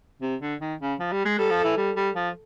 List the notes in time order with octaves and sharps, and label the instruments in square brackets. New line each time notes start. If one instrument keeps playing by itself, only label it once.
[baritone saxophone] C3
D3
D#3
C#3
F3
G3
G#3
[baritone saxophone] G3 [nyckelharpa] A4
[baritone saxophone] F3
E3
G3
G3
F3